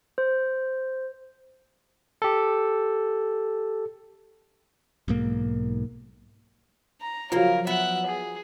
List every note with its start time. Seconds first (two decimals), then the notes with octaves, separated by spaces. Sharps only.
0.18 C5
2.22 G4 A4
5.08 B1 G#2 A#3
7.01 A#5
7.32 C#3 F3 F#3 A#3 A#4
7.67 B3 E5 F#5
8.06 G#4